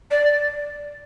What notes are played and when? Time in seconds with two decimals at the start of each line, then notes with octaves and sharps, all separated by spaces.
0.11 D5